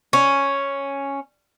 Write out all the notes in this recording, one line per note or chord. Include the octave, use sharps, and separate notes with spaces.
C#4